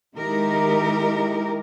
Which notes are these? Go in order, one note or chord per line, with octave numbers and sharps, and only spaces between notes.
D#3 G#3 D#4 E4 G4 A#4